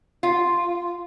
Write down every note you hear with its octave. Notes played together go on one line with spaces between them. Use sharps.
F4